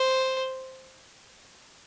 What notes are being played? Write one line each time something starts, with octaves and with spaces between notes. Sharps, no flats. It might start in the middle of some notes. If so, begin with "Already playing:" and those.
Already playing: C5